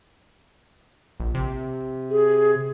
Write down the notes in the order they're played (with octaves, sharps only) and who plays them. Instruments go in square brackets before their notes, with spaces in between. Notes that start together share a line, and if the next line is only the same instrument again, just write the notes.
[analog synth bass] A#1
C3
[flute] G#4